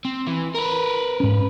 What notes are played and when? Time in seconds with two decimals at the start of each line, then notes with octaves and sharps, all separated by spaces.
0.05 C4
0.27 E3
0.54 A#4 B4
1.20 G#2 C#4